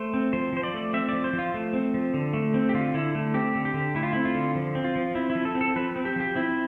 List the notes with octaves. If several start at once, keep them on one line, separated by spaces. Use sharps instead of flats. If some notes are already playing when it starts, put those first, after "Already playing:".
Already playing: A3 C5
C4
F3 C5
F3 C5
D5
A3
C4 E5
F3 D5
C5
F3
F4
A3
C4
F3
D3
A3
C4
G4
D3 F4
D3 E4
A3
C4 G4
D3
G4
D3
A3 E4
F4
C4 E4
F4
D3
F3
C4
F4
F3
C4 E4
E4
F3
A4
C4
A4
F3 B4
C4
G4
F3 G4
C4 E4